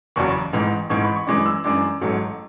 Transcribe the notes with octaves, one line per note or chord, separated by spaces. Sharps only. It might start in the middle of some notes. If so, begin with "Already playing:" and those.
F#1 E2 C#3 F#3 C#6
A1 G#2 E3
A1 G#2 E3 C#6
B5
C#6
F#2 E3 G#3 D4 D6
E6
F#2 E3 G#3 D4 D6
A1 G#2 F#3 A3